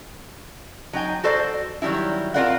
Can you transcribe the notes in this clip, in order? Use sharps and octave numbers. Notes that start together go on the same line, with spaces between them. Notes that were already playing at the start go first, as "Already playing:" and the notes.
F#3 D#4 G5 G#5
F#4 A4 C5 D5
D#3 F#3 G3 D#4 E4
C4 F4 A#4 D5 F5 F#5